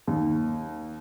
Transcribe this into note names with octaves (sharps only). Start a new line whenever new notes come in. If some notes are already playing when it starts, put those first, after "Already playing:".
D#2